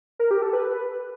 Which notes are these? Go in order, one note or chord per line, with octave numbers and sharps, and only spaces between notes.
A#4
G4
A4
B4